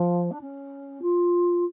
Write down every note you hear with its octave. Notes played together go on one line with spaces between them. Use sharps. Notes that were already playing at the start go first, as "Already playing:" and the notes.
Already playing: F3
D4
C#4
F4